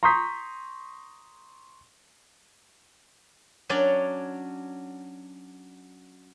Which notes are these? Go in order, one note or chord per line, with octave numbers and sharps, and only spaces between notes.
A#5 C6 C#6 D#6 G6 B6
F#3 C#4 D4 C#5 D5